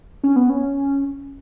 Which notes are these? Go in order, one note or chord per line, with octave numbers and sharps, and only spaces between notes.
C#4
B3
C#4